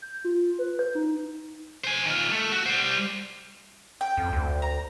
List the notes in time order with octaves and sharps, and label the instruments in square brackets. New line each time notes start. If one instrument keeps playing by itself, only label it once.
[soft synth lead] G6
F4
B4
G6
D#4
[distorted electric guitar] C5 G#5
D#3 F4
A3
F#4
G3 C5
[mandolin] G5
[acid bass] F2
D2
[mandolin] A#5